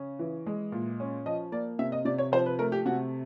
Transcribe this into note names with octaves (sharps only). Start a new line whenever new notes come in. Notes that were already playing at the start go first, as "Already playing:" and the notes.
Already playing: C#3 C#4
E3
G#3
A#2
C#4
F3 D#5
A#3 D5
C3 E5
D#5
C3 D5
C#5
F3 C5
B4
A3 A#4
G4
C3 F#4